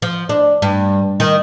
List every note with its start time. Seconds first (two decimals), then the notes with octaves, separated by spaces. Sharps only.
0.02 F3
0.29 D4
0.62 G2
1.20 D#3